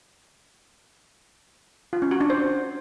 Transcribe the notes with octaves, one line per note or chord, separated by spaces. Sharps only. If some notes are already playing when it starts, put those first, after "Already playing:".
F4
C#4
F#4
D4
C5